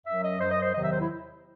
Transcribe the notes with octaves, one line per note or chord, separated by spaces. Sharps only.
F#2 F#3 E5
D#5
F#2 F#3 C5
D#5
C5
E2 C3 D#3 F#3 D#5
E5
C5
E4